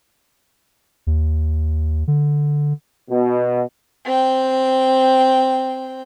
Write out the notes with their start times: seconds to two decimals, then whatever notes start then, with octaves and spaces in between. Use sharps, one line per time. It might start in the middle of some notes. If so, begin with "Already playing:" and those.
1.07 D#2
2.08 D3
3.10 B2
4.05 C4 G5